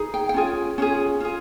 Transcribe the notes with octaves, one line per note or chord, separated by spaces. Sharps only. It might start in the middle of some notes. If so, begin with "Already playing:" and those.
Already playing: D#4 G#4
G5
G5
C#4 F4 G#4
C#4 F4 G#4
F4 G#4